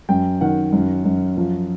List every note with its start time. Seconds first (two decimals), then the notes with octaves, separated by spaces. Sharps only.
0.09 F#2 G5
0.41 D#3 F#5
0.73 F#2
1.05 F#2
1.37 F3